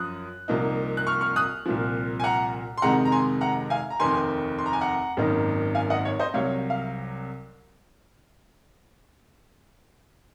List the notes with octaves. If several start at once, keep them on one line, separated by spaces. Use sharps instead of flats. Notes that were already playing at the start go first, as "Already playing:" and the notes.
Already playing: F#2 F3 D#6 F#6
C2 C3 F3 A#3 D#4
F#6
C#6 F6
C#6 F6
D#6 F#6
C2 A#2 F3
G#5
F#5 A#5
C6
F2 C3 D#3 G#3 F#5 A#5
A#5
G#5 C6
F#5 A#5
F5 G#5
A#5
F1 D#2 D#3 G#5 C6
C6
A#5
G#5
F#5 A#5
G#1 F#2 D#3 A#3 D#4
F5 G#5
D#5 F#5
C#5
C5 D#5
C2 C3 F#3 C#5 F5
F5